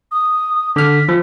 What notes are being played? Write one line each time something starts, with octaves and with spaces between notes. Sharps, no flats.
D#6
D3 F6 B6
F3